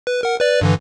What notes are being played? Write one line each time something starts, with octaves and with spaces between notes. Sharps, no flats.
B4
A#4 F#5
B4 D5
G2 D3 E3